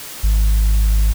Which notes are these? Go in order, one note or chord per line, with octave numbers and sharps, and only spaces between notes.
G#1